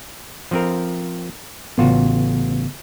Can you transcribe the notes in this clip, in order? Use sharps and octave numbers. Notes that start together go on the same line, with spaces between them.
F3 C4 A#4
A1 C#3 B3 F4 F#4